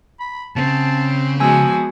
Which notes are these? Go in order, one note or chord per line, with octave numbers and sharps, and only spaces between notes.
B5
C#3 C4 A5
F3 G#3 B3 F#4 G#5 E6